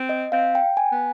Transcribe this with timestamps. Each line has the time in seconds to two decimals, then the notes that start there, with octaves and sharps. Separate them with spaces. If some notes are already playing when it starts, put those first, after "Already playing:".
Already playing: C4
0.09 D#5
0.32 C4 F5
0.55 G5
0.77 G#5
0.92 B3